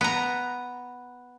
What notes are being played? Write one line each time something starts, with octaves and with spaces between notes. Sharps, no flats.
B3 A#5